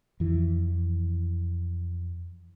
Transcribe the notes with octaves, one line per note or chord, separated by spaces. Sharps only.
F2 E3